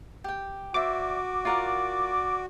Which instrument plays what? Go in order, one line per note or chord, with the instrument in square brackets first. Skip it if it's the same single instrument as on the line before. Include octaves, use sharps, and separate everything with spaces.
[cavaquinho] G4 G5
[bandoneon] F#4 [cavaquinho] C5 D5 E5 [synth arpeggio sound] D6
[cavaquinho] F4 A#4 F#5 [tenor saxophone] D5